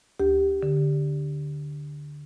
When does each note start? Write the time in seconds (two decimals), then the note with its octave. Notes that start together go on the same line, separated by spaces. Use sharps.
0.19 D2 G4
0.63 D3